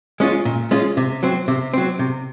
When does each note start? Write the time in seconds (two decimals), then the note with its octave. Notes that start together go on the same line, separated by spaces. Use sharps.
0.20 G#3 C#4 F4
0.45 A#2
0.71 G#3 C#4 F4
0.97 C3
1.23 F#3 C4
1.48 C3
1.74 F#3 C4
1.99 C3